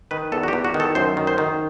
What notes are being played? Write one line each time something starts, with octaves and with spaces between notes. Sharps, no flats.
D#3 B4
E2 A4
F#4
G4
E2
F#4
D#3
A4
F#2 C5
D#3
C5
D#3